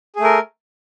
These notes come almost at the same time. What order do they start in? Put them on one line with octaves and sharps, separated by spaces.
G#4 A3 A#4